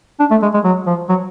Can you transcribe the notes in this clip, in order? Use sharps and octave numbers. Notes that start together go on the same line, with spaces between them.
D4
A3
G#3
G#3
F#3
F3
F#3